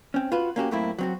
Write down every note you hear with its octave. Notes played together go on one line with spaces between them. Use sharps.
C4 C#4
F4 F#4 B4
A#3 C#4 F#4 G4
F#2 A2 A3 A#3 C4 E4
F#3 C4 F#4